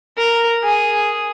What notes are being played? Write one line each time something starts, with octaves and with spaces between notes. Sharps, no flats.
A#4
G#4